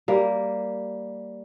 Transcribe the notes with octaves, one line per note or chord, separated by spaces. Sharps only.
G3 A#3